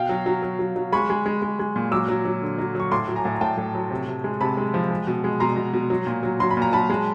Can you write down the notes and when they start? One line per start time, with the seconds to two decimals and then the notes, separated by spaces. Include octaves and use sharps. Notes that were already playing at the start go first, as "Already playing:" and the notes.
Already playing: B2 F5 G5
0.09 F#3
0.26 F#3
0.43 F#3
0.59 F#3
0.76 F#3
0.92 G#3 B5 C#6
1.10 G#3
1.26 G#3
1.42 G#3
1.59 G#3
1.76 A#2
1.91 F#3 D6 E6
2.09 F#3
2.25 F#3
2.42 D3
2.58 F#3
2.75 F#3 C#6
2.91 A2 C6 D6
3.08 F#3
3.16 G#5 A#5
3.25 A2
3.35 A#5
3.41 A2 G5 A5
3.57 A2
3.75 F#3
3.91 C3
4.07 C3
4.24 G#3
4.41 C3 A5 B5
4.57 G#3
4.74 F3
4.91 G#3
5.07 B2
5.24 G#3
5.40 B2 A#5 C6
5.57 B2
5.73 B2
5.90 F#3
6.07 A#2
6.23 F#3
6.40 F#3 C6
6.51 B5
6.57 A#2
6.62 A#5
6.73 F#3 A5 B5
6.90 G#3